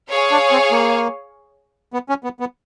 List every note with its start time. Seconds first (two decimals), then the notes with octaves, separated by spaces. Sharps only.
0.11 G#4 C#5 F5
0.31 D4
0.51 C4
0.71 A#3
1.93 B3
2.09 C#4
2.24 B3
2.40 B3